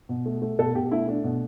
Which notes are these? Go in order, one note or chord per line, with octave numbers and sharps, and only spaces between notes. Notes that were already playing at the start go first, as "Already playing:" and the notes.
B2
A3
A3
B2 A4
B2 G4
A3 E4
A3 D4
B2